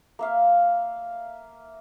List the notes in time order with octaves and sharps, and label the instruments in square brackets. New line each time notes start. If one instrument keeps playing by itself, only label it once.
[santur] A#3 E5 F5